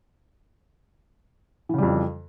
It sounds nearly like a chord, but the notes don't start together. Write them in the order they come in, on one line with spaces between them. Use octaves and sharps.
E3 C#3 G3 F2